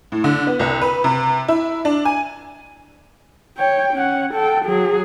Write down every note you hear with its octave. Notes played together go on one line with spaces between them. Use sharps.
A2
D3
B3
C2
B4
C3
E4
D4
G#5
C#5 G5
C#4 F#5
A4 G5
F#3 G#4